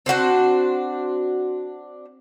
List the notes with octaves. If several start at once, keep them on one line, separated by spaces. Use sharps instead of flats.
C4 D4 F#4 C5